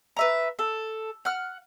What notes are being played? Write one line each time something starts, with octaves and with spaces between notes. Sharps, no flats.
B4 E5 A#5
A4
F#5 F6